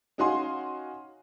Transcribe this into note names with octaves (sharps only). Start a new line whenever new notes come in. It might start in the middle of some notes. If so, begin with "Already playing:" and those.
C#4 D#4 F#4 F5 G#5 C6